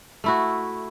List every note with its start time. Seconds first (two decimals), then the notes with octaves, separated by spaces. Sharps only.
0.24 A3 E4 F#4